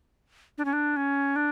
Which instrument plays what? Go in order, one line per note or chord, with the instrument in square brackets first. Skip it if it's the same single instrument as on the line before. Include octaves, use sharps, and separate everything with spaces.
[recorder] D4
C#4
D4
C#4
D4